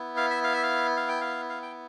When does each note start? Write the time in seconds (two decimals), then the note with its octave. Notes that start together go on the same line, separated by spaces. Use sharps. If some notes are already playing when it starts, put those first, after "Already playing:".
Already playing: B3 E4
0.17 F5
0.30 E5
0.44 F5
0.53 E5
0.63 F5
0.97 F5
1.09 G5
1.21 F5
1.50 F5
1.63 G5